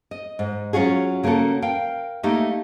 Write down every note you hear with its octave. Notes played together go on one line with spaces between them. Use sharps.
D#5
G#2
F#3 C#4 F4 F#4 G#4
C#3 A#3 C#4 F#4 A4
A#4 F5 G5
A3 A#3 D#4 G4